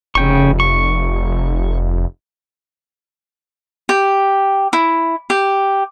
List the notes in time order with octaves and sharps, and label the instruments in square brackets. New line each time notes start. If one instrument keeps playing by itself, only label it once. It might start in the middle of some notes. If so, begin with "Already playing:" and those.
[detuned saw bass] F1 [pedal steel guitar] C#3 G5 C#6
[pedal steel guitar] C#6
[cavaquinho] G4
E4
G4